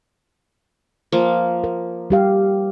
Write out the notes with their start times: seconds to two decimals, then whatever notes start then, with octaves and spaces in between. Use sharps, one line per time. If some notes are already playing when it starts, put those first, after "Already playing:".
1.12 F3 A#3
1.64 A#4
2.10 G3 G4 F5